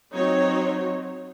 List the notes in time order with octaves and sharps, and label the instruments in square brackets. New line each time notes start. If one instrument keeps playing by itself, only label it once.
[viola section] F#3 C4 D#4 C#5